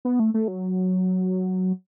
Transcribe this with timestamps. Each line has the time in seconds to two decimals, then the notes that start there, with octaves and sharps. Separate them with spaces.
0.05 B3
0.20 A3
0.34 A3
0.48 F#3